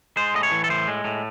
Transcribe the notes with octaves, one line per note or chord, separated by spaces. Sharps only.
G#3 C5
A2 D#5
C#5
E3
A4
A2 C5
G#3
A2